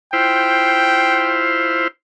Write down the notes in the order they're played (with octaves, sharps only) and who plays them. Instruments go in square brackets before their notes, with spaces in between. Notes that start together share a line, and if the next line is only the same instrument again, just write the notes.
[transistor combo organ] E4 F4 C5 [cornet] G5